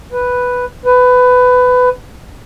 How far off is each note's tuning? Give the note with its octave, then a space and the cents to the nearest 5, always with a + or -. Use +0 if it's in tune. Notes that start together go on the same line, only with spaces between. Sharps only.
B4 +0
B4 +20